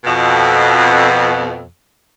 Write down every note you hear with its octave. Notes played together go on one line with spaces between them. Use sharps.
F2 B2